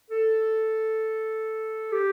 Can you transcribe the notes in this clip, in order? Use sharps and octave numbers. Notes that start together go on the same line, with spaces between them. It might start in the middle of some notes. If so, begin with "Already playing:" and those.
A4
G4